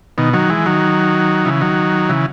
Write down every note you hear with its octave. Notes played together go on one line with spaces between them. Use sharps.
B2 D#3
D#3 F#3
E3 G#3
D#3 F#3
C#3 E3
D#3 F#3
C#3 E3